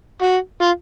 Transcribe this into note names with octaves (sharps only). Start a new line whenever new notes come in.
F#4
F4